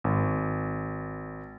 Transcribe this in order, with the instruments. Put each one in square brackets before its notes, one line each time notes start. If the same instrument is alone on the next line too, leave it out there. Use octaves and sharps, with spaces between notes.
[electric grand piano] G#1